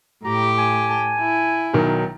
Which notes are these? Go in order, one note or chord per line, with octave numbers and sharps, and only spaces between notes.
A2 G4 A#5
G#5
A5
E4
B1 D#3 F#3